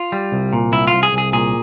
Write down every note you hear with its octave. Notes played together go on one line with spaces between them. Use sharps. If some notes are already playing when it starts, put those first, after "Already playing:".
Already playing: F4
G3
C2
A#2
C2 E4
F4
C2
G#4
C2
G#4
A#2 G#4